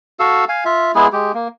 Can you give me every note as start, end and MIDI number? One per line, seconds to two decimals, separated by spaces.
0.20 0.45 66
0.20 0.45 69
0.20 0.45 77
0.20 0.45 88
0.49 0.64 77
0.49 0.64 80
0.65 0.92 65
0.65 0.92 76
0.95 1.07 56
0.95 1.07 59
0.95 1.07 64
0.95 1.07 68
1.13 1.32 56
1.13 1.32 67
1.34 1.48 58